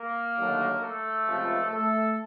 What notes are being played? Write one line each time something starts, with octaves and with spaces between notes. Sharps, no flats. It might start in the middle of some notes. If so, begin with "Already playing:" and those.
Already playing: A#3 A#4
D#2 D3 F#3 A3 D4
A3 A4
C#2 C3 F3
A3 A4